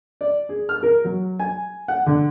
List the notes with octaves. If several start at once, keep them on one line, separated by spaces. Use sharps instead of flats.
D5
G#4
F6
A#4
F#3
G#5
F#5
D3